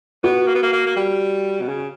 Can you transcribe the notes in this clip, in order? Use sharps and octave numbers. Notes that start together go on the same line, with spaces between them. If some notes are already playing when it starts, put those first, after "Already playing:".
B3 F#4
A#3
B3
A#3
A#3
A#3
G3
B2
C#3